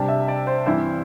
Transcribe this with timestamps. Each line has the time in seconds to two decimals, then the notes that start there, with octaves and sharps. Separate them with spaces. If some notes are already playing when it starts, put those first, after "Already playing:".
Already playing: C3 G3 D4 A5
0.08 E5
0.28 D5
0.47 C5
0.66 G2 E3 C4 E4 C5